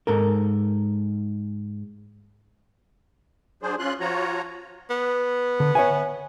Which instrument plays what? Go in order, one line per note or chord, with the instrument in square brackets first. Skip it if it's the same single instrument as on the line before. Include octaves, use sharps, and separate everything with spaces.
[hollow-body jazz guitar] G#2 A4 A#4
[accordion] F#3 D4 G#4 C5
C#4 F4 C6 F#6
F3 F4 F#4 C#5 A#5
[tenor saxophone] B3
[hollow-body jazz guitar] D3
C#5 E5 G#5